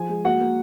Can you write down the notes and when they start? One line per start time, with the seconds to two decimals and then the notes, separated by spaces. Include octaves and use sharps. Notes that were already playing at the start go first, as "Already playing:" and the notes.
Already playing: F3 G#4 G#5
0.09 G#3
0.24 A#3 F#4 F#5
0.41 A#3